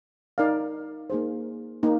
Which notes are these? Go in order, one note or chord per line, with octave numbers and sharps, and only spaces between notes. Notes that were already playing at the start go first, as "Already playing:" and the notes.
D#4 A#4 D5 F5
A#3 D#4 G#4 C5
A#3 D#4